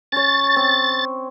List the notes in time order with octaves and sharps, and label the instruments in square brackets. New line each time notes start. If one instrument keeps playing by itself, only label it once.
[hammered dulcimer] C#4 C#5 [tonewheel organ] A6
[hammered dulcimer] C4